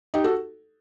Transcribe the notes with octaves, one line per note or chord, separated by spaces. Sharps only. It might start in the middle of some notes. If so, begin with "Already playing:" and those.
D#4 G4
F#4 A4